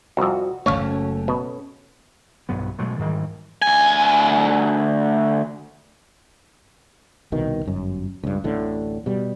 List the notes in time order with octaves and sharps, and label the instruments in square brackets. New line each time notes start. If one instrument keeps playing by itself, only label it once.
[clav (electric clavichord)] C2 F2 [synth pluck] F#4
[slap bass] F#1 C#2 A3 [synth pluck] C#4 A4 [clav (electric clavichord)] C#5 F5
[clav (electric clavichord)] B2
[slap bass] B1 G2 F#3 B3
B2 F#3 G#3 A3
G#2 D#3 E3 G3
[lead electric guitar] D2 G#5
[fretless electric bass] C2 B2 D#3
G1 F#2
C#2 G2
D1 A1 A2 D3
B2 G3